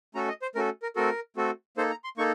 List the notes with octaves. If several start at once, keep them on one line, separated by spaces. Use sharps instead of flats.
A3 C#4 F#4 A4 A#5
D#5
C5
A3 C#4 F#4 A4 A#4
A#4
A3 C4 F#4 A4 A#4
A3 C4 F#4 A4
A#3 D#4 A4 C5
A#5
C6
A#3 D#4 A4 C#6